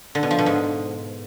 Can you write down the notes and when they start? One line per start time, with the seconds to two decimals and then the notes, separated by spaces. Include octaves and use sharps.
0.15 D3
0.23 B2
0.31 F3
0.38 B2
0.46 G#2